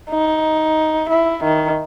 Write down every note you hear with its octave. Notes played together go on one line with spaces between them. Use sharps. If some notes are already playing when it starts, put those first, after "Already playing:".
D#4
E4
D#3